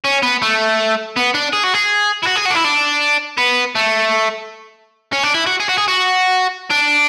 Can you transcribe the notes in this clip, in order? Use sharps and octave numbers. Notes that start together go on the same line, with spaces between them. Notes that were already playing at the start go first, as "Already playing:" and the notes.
C#4
B3
A3
B3
D4
G#4
F#4
G#4
E4
F#4
G#4
F#4
D4
E4
D4
B3
A3
C#4
D4
E4
F#4
G#4
F#4
G#4
F#4
D4